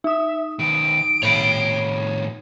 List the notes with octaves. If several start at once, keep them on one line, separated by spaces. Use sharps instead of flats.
D#4 E5 D#6
D#3 F#3 D7
A2 D#3 C#5 B5